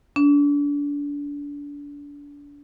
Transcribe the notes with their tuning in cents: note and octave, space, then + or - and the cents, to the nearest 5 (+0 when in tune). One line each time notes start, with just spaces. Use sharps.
D4 -30